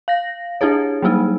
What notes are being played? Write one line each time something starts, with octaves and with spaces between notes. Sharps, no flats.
F5 A#6
D4 E4 G4 G#4 C#5
F#3 G3 A#3 D#4 E4